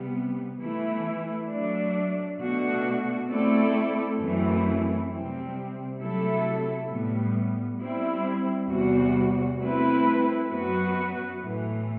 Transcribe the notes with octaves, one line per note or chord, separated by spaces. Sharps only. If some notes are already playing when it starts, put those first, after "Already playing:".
Already playing: C3 G3 B3
E3 A3 E4
F#3 A3 D4
B2 A3 D4 F#4
A3 C4 E4 A4 D5
F#2 E3 A3 C4 E4
C3 G3 C4
C3 F#3 A3 E4 A4
A2 G3 B3
G3 C4 E4
E2 C3 G3 B3 F#4
A3 C4 E4 B4
F#2 F#3 B3 F#4 B4
A2 E3 A3